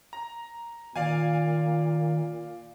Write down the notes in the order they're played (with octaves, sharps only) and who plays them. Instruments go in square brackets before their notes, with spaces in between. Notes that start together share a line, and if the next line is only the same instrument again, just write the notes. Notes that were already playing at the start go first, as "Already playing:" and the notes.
[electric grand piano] A#5
[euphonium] A#2 [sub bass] D#3 [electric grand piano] D5 F5 G#5